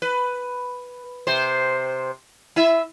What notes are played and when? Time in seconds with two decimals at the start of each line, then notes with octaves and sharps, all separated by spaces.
0.02 B4
1.27 C3 C5
2.56 E4 E5